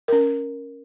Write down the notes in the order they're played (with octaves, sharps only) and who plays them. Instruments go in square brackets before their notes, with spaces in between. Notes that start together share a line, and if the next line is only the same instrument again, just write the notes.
[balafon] C#4 A#4